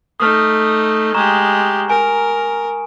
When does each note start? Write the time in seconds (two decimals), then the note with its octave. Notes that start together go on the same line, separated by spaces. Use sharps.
0.20 A3 D#4 D#6 F6
1.14 G#3 G4 A#5 C#6 E7
1.90 A#4 G#5 D7